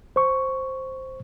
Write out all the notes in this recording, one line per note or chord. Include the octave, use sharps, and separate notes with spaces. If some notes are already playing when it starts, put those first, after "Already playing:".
C5 C#6